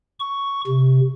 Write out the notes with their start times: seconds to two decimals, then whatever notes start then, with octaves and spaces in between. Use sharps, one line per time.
0.20 C#6
0.67 C3